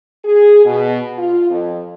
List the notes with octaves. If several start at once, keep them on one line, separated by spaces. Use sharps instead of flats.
G#4
B2
F4
F2